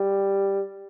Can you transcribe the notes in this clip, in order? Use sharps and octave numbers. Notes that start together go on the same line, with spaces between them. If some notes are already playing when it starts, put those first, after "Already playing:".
Already playing: G3